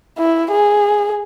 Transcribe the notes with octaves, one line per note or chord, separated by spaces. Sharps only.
E4
G#4